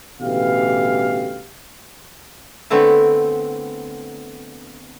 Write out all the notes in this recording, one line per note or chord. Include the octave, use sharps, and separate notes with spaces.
A1 B2 D3 E3 G4 F5
D3 A3 B3 C4 E4